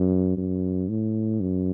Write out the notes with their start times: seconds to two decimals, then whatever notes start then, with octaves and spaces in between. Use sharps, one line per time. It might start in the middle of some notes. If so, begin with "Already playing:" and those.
Already playing: F#2
0.37 F#2
0.89 A2
1.40 F#2